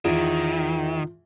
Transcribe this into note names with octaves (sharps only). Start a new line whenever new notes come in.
E2 D#3 F4